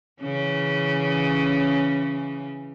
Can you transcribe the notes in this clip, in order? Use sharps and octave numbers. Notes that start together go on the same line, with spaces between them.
C#3 E3 C#4